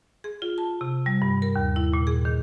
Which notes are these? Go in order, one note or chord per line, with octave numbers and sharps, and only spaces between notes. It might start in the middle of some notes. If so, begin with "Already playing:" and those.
G#4
F4
A5
C3
G3
G2
A#4
D#2
E4
A#2
G#4
D#3